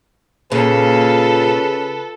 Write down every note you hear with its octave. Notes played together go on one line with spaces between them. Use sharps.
A#2 C#3 A4 B4